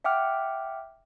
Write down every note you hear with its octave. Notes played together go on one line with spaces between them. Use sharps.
E5 F#5 G5 D6 F6